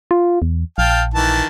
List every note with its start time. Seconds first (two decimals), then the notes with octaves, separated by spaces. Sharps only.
0.11 F4
0.42 E2
0.78 A#1 F5 G5 A5
1.14 D#3 E3 A5